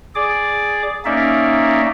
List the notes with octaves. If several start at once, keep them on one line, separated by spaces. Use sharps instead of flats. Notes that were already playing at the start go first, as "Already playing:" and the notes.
G#4 D5 D6
A#3 C#4 D#4 D5 E5